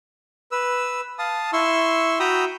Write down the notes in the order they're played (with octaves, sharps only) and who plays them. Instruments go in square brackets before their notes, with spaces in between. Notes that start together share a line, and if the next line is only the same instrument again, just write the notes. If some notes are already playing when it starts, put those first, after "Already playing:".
[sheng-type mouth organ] B4 E6
F5 A5 D#6
E4 C6 C#6 E6
F#4 G5 A#5 B5 D#6 E6